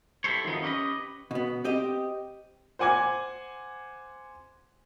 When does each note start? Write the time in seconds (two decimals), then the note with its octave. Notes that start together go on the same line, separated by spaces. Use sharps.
0.24 E4 G4 A4 C5 C#5
0.44 D#3 F3 F#3 B3 D#4
0.62 C#4 G4 A#4 B4 D#5
1.31 B2 B3
1.64 C4 G4 D#5
2.79 C5 F#5 G#5 D6 G#6